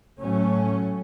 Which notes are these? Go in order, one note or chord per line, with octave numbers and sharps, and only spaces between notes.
A2 F#3 A3 C#4